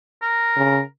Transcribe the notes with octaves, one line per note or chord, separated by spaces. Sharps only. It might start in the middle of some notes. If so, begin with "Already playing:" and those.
A#4
C#3